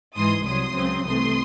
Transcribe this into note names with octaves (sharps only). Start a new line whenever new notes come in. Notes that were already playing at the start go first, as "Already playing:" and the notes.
G#2 E3 G#3 C6 D#6
C2 C3 F#3 C6 D#6
C#2 C#3 F#3 C4
C2 C3 E3 A3 C6 D#6